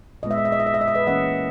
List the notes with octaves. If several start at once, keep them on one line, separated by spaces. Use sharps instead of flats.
A#2 G#3 B3 D#5
E5
D#5
E5
D#5
E5
D#5
E5
D#5
E5
B4 D#5
E3 A#3 C#4 D#5 F#5